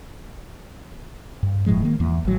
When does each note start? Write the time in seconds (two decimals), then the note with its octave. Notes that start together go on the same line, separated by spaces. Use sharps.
1.43 G2
1.66 D#1 A2 F3 G#3
1.82 D#3 A#3
2.00 E2
2.25 G#1 F#3